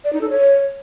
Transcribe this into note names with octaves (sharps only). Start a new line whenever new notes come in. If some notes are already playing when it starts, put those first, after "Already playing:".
D5
D#4
A4
C#5